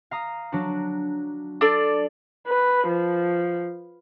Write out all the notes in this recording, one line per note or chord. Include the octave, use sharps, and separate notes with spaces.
F5 A#5 D#6
F#3 D4 F#4
D4 A4 D5
B4
F3